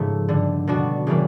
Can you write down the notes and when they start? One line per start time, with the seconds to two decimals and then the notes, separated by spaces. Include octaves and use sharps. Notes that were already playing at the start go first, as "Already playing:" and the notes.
Already playing: G#2 C#3 F3 A3 B3
0.28 G2 D3 G3
0.67 B2 G3 B3 D4 F#4
1.07 C#3 E3 G3 A#3